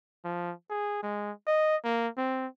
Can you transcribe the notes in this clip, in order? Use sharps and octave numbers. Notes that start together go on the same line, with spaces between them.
F3
G#4
G#3
D#5
A#3
C4